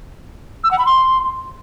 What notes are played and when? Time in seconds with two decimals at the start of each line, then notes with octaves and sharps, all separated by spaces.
0.64 E6
0.71 F#5
0.78 B5
0.86 C6